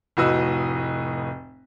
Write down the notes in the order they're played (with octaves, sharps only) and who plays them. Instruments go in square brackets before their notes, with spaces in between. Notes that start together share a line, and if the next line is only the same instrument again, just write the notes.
[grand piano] F1 A2 F#4 B4 D#5 E6